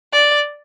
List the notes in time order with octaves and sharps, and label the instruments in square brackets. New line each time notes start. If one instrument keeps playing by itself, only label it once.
[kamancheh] D5